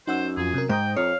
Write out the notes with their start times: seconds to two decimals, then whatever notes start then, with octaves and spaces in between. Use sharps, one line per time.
0.07 F#2 D#4 C5 F#5 E6
0.37 F2 F4 G#4
0.54 C3 A#4
0.69 G#2 C5 G5 A#5 D#6
0.97 F2 C#5 F5